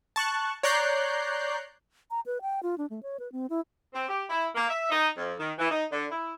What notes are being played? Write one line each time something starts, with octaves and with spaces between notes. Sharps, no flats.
A5 C#6 F#6
C#5 D5 A#5 F#6 G6 C7
A#5
B4
G5
F4
D4
A3
C#5
B4
C4
E4
C4
G4
E4
A#3
E5
D#4
F2
D#3
E3
D#4
D3
E4